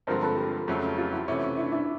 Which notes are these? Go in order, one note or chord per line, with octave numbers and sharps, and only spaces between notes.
G2 D3 F3 G#3 C4 A#4 C5
A4 B4
G4 A4
F2 C#3 F#3 A3
F4 G4
E4 F#4
C3 E3 A3 C#4
D4 E4
D4 E4